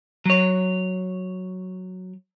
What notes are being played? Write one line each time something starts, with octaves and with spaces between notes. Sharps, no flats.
F#3 C#5